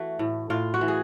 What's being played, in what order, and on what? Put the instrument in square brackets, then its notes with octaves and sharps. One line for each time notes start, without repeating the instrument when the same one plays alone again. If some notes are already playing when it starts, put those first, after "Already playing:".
Already playing: [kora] E3 A3 F#4
A2
A2 F4
F#4
E3
G#4